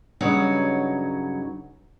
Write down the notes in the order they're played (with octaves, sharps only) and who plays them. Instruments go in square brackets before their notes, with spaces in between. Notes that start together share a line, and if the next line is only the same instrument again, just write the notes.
[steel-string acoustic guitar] G2 C#3 F#3 D#4 C#5 F#5